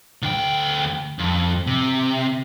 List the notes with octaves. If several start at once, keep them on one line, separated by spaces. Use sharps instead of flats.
D2 G5
F2
C3